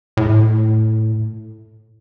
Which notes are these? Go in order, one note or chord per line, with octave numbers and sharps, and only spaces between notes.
A2